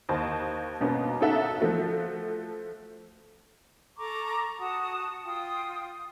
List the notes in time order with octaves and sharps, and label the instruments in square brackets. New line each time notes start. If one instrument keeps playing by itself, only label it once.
[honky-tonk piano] D#2 C5 D#5 A5
G2 B2 A#3 B3 C#4
C#4 D#4 A4 E5 F#5
F3 A3 F#4
[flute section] A4 A#5 C#6 D6
F#4 F#5 A5 D#6
F4 G5 D#6